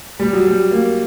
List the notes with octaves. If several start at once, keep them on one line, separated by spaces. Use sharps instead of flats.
G3
F#3
G3
A#3